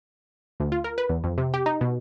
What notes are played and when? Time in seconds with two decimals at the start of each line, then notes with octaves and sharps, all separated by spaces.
0.60 D2
0.72 F4
0.84 A#4
0.98 B4
1.09 E2
1.24 F2
1.38 C3
1.54 G4
1.66 D#4
1.81 B2